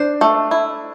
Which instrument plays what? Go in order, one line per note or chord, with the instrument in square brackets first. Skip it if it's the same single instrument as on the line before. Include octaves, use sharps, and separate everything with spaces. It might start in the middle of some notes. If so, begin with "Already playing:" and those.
Already playing: [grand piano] D4 [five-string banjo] C5
[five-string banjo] A3
E4